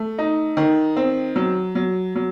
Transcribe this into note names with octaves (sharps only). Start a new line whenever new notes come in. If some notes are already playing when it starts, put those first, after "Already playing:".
Already playing: A3
D#4
D#3
C4
F#3
F#3
F#3